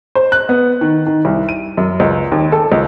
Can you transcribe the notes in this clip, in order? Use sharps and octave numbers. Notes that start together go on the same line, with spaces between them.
C5
F#6
B3
D#3
D#3
C2
D#7
F#2
C#2
D#2
A4
C#2